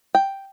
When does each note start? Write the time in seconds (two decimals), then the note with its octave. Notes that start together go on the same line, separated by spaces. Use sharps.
0.15 G5